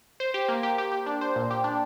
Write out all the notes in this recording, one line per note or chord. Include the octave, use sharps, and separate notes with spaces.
C5
G4
A#3
G4
G4
G4
D4
C5
A#2
G4
D4